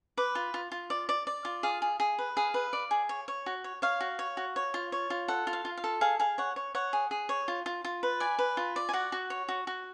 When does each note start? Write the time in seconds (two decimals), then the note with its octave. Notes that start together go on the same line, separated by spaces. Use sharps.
0.17 B4 D6
0.35 F4
0.54 F4
0.72 F4
0.90 D5
1.09 D5
1.27 D5
1.45 F4
1.63 G#4 F5
1.82 G#4
2.00 G#4
2.18 B4
2.37 G#4 F5
2.54 B4
2.73 D5
2.91 G#4
3.09 C#5
3.28 C#5
3.46 F#4
3.64 C#5
3.82 C#5 F5
4.01 F#4
4.19 C#5
4.37 F#4
4.56 C#5
4.74 F4
4.92 C#5
5.10 F4
5.28 A4 F#5
5.47 F4
5.53 F5
5.65 F4
5.77 F5
5.84 A4
6.01 G#4 F5
6.20 G#4 F5
6.38 C#5 F#5
6.56 C#5
6.75 C#5 F#5
6.93 G#4
7.11 G#4
7.29 C#5
7.48 F4
7.66 F4
7.85 F4
8.03 B4
8.20 D5 G#5
8.39 B4
8.57 F4
8.76 D5
8.89 G#5
8.93 F#4 F#5
9.12 F#4
9.30 C#5
9.49 F#4
9.67 F#4